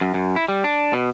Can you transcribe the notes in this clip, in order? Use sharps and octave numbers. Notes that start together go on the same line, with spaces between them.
F#2
F#2
E4
G3
D4
B2